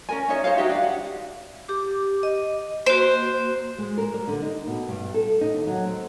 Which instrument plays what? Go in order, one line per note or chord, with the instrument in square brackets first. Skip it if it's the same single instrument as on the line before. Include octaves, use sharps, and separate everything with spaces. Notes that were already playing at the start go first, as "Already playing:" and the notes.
[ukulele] C#4 A#4 G#5
C#4 D#4 C#5 E5
D#4 C5 C#5 F5
D#4 F#4 G4 E5
D4 F5
F#5
[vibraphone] G4 D6
D#5
[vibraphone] A#3 F#4 [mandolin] C5
[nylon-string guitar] G#3
A#4
G3
D3
D#4
B2
G2
A4
D#4
D#2
F#3
C4